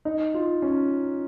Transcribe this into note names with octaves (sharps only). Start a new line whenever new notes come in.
D#4
F4
C#4